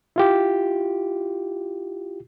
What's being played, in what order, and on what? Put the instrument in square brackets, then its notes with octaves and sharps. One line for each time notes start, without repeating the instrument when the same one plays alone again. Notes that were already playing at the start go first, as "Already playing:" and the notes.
[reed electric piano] E4 F4 G4